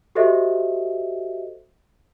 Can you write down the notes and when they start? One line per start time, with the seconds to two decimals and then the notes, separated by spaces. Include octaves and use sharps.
0.15 F#4 G4 A4 C5 D#5 E5